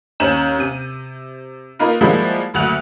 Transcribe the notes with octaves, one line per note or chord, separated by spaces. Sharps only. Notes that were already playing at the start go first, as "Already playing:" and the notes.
D#2 C#4 A#5 G6 E7 F#7
C3 D#7
A#3 D#4 F4 A#4 B4
F3 G3 G#3 A#3 E4 F#4
F#1 D2 F#4 F#6 F7